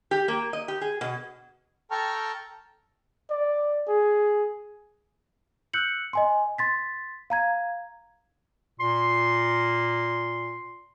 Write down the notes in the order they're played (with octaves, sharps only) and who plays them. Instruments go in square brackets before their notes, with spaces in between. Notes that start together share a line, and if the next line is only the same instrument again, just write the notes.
[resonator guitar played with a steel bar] G4
A#3
D#5
G4
G#4
B2
[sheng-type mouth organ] A4 G5 A5 A#5 C#6 F6
[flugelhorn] D5
G#4
[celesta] E6 F#6 G6 C#7 F#7
D#5 G#5 C6
C6 A6 B6
F5 A#5 G#6
[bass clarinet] A#2 [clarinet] C6